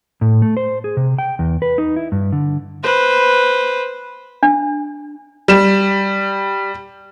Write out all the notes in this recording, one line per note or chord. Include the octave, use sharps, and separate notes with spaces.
A2
A3
C5
G#4
C3
G5
E2
B4
D#4
E4
G2
D3
B4 C5
D4
G3 E7